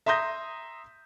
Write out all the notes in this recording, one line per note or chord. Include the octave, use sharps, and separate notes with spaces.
E5 A#5 C6 D#6 G6 A#6